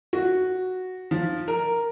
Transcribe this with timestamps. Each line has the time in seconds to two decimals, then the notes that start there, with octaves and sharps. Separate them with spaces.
0.13 F#4
1.11 F3
1.48 A#4